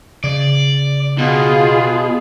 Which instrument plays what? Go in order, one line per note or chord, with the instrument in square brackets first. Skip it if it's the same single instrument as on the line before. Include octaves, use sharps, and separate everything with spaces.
[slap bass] C#3 [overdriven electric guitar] D5
[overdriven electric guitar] B2 [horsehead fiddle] F4 G#4